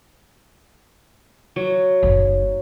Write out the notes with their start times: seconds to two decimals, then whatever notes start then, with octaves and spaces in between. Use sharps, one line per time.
1.56 F#3
2.03 F#1 D#4